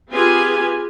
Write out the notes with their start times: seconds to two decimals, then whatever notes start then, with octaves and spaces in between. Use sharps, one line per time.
0.12 C4 F4 G4 G#4 B4 G#5